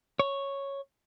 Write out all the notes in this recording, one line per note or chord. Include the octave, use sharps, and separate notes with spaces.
C#5